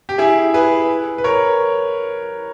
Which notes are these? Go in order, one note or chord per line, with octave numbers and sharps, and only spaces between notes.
G4
E4 G#4
G#4 B4
B4
A#4 C#5